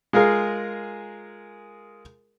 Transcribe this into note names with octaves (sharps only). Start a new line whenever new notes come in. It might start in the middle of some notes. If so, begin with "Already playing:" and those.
G#3 F4 G#4 A#4 F5